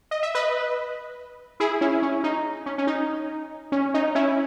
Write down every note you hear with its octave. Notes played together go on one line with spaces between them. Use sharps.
D#5
E5
B4 D#5
E4 G#4
C#4 E4
C#4
D#4
C#4
C#4
D#4
C#4
D#4
C#4 E4